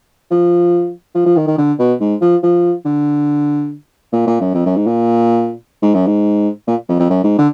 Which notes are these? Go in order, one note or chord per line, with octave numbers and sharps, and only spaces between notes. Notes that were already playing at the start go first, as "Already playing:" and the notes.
F3
F3
F3
D#3
D#3
D3
B2
G#2
F3
F3
D3
A#2
A#2
F#2
F2
F#2
G#2
A#2
G#2
F#2
G#2
A#2
F2
F2
F#2
G#2
D3